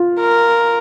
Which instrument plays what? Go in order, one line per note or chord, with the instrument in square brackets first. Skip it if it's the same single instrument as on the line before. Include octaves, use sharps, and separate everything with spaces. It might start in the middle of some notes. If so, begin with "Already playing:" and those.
Already playing: [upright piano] F4
[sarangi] A#4